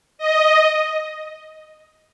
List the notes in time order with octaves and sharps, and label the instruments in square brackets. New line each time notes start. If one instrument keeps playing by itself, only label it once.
[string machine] D#5